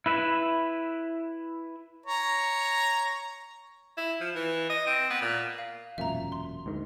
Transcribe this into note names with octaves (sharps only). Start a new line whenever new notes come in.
E4 B4 E5
C#5 A#5
E4
F3
E3
D#5
C4
B3
A#2
F5
E1 F#2 A#2 E5 A#5
C6
D2 G#2 D#3